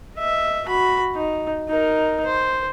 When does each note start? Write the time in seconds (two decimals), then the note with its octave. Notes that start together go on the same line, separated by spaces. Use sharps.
0.16 D#5 E5
0.66 F#4 B5
1.15 D#4
1.69 D#4 A#4
2.26 C5